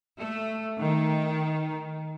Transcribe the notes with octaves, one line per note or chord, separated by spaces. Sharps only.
A3
D#3